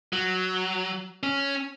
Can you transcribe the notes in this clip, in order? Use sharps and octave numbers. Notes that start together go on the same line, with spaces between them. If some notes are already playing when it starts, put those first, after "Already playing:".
F#3
C#4